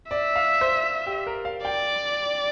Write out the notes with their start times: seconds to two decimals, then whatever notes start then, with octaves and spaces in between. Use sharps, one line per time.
0.11 D5 E5
0.36 F5
0.61 C5
1.07 G4
1.26 A#4
1.45 F5
1.65 D5 G5